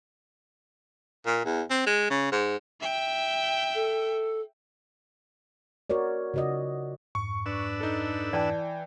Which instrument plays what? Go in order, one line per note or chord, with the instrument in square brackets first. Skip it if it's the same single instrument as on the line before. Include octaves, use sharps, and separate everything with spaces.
[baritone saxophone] A#2
E2
C4
G#3
C#3
G#2
[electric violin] E5 G5
[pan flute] A4
[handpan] F#4 A#4 C#5 D5
C#3 F4 F#4 D5 D#5
[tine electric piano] F2 G#2 [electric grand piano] C#6
[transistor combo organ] D4 B4 E6
[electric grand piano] D#4 A4
[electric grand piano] E3 G5 [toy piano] D5 A5